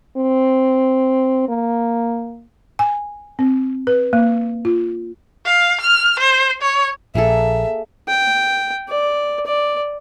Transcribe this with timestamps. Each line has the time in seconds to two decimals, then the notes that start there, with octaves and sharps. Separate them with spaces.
0.17 C4
1.49 A#3
2.79 G#5
3.39 C4
3.87 B4
4.13 A#3
4.65 F4
5.46 F5
5.81 F6
6.20 C5
6.62 C#5
7.15 A#1 A#3 G#4 A4 E5
8.08 G5
8.89 D5
9.46 D5